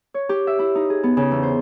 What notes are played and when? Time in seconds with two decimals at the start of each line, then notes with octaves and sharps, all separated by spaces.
0.14 C#5
0.29 G4
0.47 E5
0.59 E4
0.75 D#4
0.90 G#4
1.03 B3
1.17 C#3
1.31 E2
1.43 C5